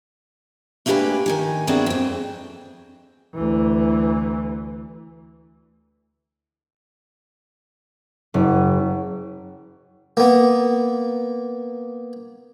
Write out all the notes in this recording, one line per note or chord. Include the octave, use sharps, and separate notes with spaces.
A3 A#3 D4 G4 B4 G#5
D#3 D#4 G#5
B3 C4 D4 E4 F#4 G#4
F2 C4
D2 E3
F#1
A#3 B3